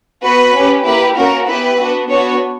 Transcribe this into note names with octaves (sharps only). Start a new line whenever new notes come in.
B3 F#4 B4
C#4 G4
A#3 E4 G4 B4
A#3 C#4 F#4 A#4
B3 E4 G4 B4
B3 D4 F#4
B3 D4 F#4 C#5